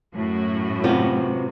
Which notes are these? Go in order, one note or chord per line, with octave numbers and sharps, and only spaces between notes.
F#2 A2 F#4
C3 B3 F4